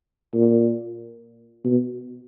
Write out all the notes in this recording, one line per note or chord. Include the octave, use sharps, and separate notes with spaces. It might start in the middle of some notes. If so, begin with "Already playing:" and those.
A#2
B2